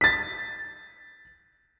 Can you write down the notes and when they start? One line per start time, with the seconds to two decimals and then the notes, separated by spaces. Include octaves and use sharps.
0.01 A6 B6